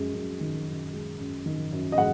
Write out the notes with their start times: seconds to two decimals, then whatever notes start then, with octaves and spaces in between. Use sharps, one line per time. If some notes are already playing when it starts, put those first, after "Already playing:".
Already playing: F#2 G#3
0.14 F#2
0.41 D#3
0.67 F#2
0.93 G#3
1.19 F#2
1.46 D#3
1.72 F#2
1.92 D#5
1.98 G#3 F#5